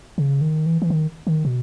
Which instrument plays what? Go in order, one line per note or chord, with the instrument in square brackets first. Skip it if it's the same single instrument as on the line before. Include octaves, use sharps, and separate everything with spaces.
[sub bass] C#3
D#3
E3
E3
D#3
D#3
B2